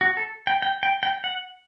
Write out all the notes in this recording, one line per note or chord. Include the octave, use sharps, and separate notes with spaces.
F#4
A4
G5
G5
G5
G5
F#5